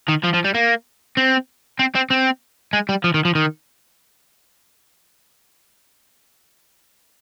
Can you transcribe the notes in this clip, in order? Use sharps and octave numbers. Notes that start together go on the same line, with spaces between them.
D#3
F3
F3
G3
A#3
C4
C4
C4
C4
G#3
G3
F3
D#3
F3
D#3